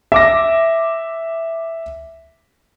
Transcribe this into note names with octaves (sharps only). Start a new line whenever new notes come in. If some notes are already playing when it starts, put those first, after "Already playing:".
E5 D6 A#6